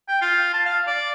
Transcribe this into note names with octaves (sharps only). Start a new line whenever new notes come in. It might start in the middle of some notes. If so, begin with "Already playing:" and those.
G5
F4
A5
F5
D5